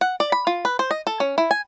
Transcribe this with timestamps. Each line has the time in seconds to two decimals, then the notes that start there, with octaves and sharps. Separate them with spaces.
0.01 F#5
0.20 D5
0.32 B5
0.47 F4
0.65 B4
0.79 C5
0.91 D#5
1.07 A4
1.20 C#4
1.38 E4
1.51 G#5